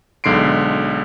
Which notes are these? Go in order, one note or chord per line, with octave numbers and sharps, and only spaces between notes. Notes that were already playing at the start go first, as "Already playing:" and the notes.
B1 G#2 D3 C6 C7 D7